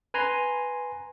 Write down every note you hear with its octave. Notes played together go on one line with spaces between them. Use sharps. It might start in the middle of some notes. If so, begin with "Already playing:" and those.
B4 G#5 A#5 C6